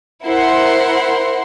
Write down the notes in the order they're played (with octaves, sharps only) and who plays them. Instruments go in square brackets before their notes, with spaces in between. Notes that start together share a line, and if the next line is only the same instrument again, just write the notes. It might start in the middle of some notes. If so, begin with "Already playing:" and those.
[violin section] E4 A#4 C5 F#5 C6